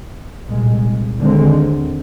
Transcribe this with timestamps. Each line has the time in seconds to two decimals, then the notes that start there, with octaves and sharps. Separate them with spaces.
0.49 C2 A#2 G#3
1.19 D#2 D3 G#3 C4